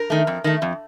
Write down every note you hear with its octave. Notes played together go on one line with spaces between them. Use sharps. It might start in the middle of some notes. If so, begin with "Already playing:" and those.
Already playing: A#4
D#3 A3
F2
D#3 A3
F2